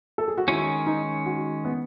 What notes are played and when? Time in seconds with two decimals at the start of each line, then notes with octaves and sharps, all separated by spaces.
0.18 A4
0.28 G#4
0.38 F#4
0.47 D#3 G#3 C#4 E4
0.86 D#4
1.26 F#4
1.65 B3